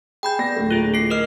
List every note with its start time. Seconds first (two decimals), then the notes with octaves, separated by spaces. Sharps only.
0.23 G#4 G5 B5 G6
0.39 B3 D5 A#6
0.56 D1 A#1 A3
0.71 F4 G#4
0.94 A4 C7
1.10 A#4 D#5 F6